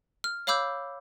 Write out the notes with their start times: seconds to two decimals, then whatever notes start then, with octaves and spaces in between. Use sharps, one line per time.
0.24 F6
0.47 C#5 F5 B5 D6 E6 G6